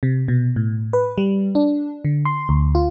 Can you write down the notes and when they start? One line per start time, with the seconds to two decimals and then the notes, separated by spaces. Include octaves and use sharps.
0.03 C3
0.28 B2
0.56 A2
0.93 B4
1.18 G3
1.55 D4
2.05 D3
2.25 C6
2.49 D2
2.75 F4